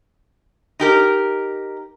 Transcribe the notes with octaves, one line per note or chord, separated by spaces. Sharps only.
D#4 G4 A#4